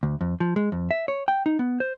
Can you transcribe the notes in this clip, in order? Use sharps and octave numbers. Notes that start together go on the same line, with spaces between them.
D2
F2
F3
G#3
F2
E5
C#5
G5
D#4
B3
C5